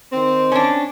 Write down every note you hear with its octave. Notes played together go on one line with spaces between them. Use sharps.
D#3 C4
C#4 D4